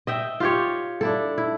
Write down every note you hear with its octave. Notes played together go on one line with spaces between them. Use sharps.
D#5 E5 G5
F4 G4 C#5
D4 E4 A4
E4